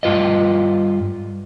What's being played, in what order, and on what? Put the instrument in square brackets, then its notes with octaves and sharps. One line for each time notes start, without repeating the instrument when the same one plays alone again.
[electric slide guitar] G2 F4 B4 D#5